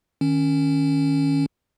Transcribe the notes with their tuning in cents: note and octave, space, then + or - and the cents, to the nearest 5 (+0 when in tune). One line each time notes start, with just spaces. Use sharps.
D#3 -15 C#4 +0